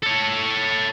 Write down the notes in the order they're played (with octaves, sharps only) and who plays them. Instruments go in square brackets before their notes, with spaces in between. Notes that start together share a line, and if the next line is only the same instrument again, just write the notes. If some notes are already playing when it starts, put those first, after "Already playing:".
[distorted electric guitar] A4 C#5